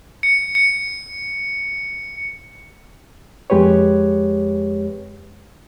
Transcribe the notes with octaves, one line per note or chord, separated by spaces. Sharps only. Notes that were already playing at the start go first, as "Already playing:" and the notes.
C#7
C#7
F2 G#3 G4 B4 C#5